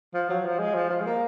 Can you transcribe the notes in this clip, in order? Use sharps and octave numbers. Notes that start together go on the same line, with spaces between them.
F3
F#3
F3
G#3
F3
F3
G#3
A#3